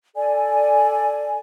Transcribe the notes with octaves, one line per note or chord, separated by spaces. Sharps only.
A4 D5 G#5